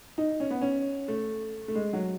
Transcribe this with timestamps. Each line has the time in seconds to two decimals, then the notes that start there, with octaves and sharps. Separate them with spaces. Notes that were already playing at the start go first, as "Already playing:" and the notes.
0.18 D#4
0.40 C#4
0.51 B3
0.62 C#4
1.08 A3
1.68 A3
1.75 G#3
1.93 F#3